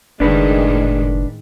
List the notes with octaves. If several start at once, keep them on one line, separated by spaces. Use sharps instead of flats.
F#1 A2 D#3 G#3 D4 B4